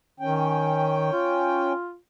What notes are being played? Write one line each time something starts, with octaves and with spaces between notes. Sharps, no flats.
D#3 C#4 G5
F4